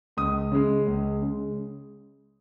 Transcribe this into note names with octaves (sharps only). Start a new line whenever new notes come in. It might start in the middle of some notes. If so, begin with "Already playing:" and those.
C#2 D#6
C#3 G#3
C#2
C#3 G#3